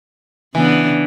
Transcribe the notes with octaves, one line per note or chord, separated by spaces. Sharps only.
C#3 E3 B3 D4